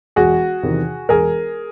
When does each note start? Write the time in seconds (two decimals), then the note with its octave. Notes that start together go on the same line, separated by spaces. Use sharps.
0.16 E1 F#4 G#4
0.63 E2 C3 D#3
1.09 E1 G#4 A#4